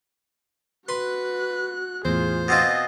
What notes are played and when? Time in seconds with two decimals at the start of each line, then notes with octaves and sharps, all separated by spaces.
0.89 F#4 B4 C6 F#6
2.05 E2 A2 F4 G#4 C5
2.48 B2 C4 F4 D#5 G#5